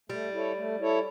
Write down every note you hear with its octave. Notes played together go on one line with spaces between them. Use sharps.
G3 A3
E4 A4 C#5
A3
E4 A4 C#5